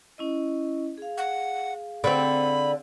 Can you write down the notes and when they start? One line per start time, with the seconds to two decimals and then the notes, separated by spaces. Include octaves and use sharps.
0.18 C#4 E4 D#5
0.98 G#4 F5
1.18 F#5
2.04 D3 C4 B5